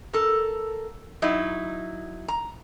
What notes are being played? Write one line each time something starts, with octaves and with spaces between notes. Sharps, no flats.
A4 A#4
F#3 D#4 E4
A#5